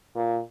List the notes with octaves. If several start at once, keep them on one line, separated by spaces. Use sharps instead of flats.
A#2